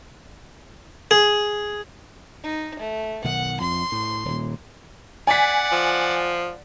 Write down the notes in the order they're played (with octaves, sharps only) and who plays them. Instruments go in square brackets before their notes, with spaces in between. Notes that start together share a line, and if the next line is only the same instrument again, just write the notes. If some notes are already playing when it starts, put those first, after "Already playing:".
[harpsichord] G#4
[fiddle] D#4
A3
[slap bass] B1 D#3 [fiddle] F#5
[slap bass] F2 [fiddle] C6
[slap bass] A2
D#1 A#2
[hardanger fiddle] D5 F#5 [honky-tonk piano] G#5 B6
[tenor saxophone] F3